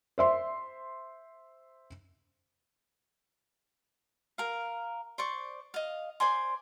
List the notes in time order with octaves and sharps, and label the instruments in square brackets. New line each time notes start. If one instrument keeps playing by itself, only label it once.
[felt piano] C5 E5 C6
[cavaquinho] A#4 F5
C5 D5 C#6
D#5 F5
C5 D5 G#5 C6